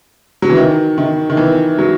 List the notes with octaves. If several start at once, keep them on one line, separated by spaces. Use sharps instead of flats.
F#3
E3
D#3
D#3
D#3
E3
F#3